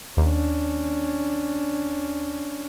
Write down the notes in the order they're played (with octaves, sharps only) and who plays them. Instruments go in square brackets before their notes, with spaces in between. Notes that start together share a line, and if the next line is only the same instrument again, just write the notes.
[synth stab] D#2 [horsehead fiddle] C#4 D4